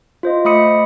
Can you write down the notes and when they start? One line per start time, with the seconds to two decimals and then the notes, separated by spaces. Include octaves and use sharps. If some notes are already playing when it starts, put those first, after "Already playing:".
0.23 F4 C5 D#5
0.45 A3 D#5 B5 D#6 C#7